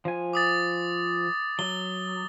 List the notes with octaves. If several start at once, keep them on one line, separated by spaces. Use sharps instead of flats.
F3 G#5
D6 D#6 A6
F#3 G7